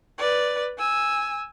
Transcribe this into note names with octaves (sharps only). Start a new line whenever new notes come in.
B4 D5
G#5 E6